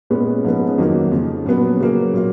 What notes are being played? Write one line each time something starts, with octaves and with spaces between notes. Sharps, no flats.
A#2 G#3 B3 C#4
G#2 F3 B3
C#4
F2 D#3 F#3 A#3 D#4
F2 C#3 F3
A#2 F#3 B3 C#4
C#3 F#3 A#3
A#2 F#3 A#3